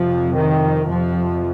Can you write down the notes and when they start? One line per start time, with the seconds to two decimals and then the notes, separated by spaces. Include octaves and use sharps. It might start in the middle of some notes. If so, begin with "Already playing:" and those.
Already playing: F2 C3 F3
0.35 D#3
0.87 F2 C3 F3